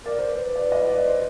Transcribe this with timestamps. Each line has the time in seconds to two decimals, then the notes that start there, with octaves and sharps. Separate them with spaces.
0.05 A#4 D5
0.19 C5
0.31 B4
0.56 D5
0.72 D#5
0.89 D5
1.06 C5